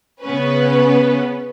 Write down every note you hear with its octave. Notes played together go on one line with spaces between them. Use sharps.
C#3 B3 C#4 B4